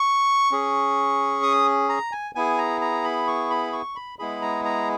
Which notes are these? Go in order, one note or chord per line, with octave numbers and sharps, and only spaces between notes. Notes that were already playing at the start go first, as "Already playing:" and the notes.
Already playing: C#6
C#4 G#4
D#6
A#5
G#5
B3 E4 G#4 G#5
A#5
A#5
B5
C#6
B5
C#6
B5
G#3 B3 E4 G#4 B5
A#5
A#5